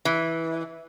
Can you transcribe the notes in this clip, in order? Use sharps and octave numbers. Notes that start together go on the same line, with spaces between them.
E3